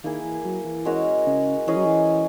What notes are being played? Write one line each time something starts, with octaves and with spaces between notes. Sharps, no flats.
D#3 A#3 E4 G#4
E3
F#3
E3
G#3 C#4 F#4 A#4
C#3
E3 C#4 G#4 D#5
F#3
E3